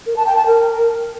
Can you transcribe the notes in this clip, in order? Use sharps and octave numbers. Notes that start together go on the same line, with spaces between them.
A#4
A5
G5
A5
A#4